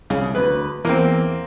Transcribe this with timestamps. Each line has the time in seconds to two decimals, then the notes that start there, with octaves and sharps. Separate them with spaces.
0.10 C2 C#3
0.35 D2 B4
0.85 E2 E3 A#3 C4